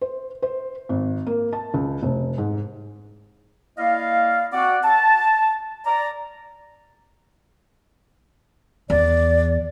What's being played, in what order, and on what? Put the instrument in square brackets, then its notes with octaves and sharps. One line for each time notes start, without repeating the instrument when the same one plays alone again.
[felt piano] C5
C5
G#1
A#3
A5
C#2
F1
G#2
[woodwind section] A#3 E4 D5 D#5 F5
C4 F#4 D5 F#5
A5
D5 A#5
[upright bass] E2 [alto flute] D5